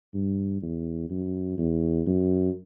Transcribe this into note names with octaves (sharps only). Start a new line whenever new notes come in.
G2
E2
F#2
E2
F#2